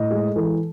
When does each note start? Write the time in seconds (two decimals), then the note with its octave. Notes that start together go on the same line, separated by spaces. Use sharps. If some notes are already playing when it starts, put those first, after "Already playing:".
Already playing: A2 D#5
0.11 G#3
0.36 E3 A4